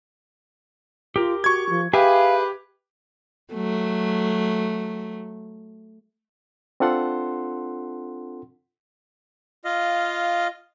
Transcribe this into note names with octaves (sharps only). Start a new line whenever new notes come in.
F4 G4 A#4
F#4 C#6 G#6
F3
G4 G#4 B4 E5 F5 G#5
F#3 A3
C4 D4 F4 A4 F#5 C6
F4 D#5 F5